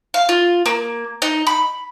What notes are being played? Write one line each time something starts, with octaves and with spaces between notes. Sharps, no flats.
F5
F4
A#3
D#4
B5